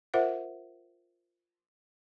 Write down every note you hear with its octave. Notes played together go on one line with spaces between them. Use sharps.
F4 A#4 C5 E5 F#5